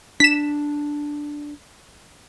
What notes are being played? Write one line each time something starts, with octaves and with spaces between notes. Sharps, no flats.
D4 B6 E7